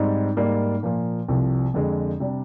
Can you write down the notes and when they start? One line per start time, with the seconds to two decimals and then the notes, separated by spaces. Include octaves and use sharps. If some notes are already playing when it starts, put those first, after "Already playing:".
Already playing: G#2 G3 C4 D#4
0.37 G#2 G3 A#3
0.83 A#2 F3 A#3
1.28 C2 C3 F3
1.74 F2 D3 G#3
2.20 C3 G3 D4